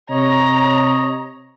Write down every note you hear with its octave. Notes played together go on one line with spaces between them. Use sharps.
C3 C#5 D#5 A#5